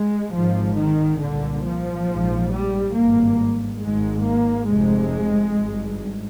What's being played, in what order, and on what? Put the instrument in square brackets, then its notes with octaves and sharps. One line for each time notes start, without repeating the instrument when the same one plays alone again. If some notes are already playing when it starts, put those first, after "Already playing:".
Already playing: [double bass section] G#3
G#1 G#2 F3
D#3
C2 A#2 D3
F3
A#1 G#2
G3
G#1 G2 A#3
G#1 G#2 G#3
A#3
F1 F2 C3 G#3
G#1 G2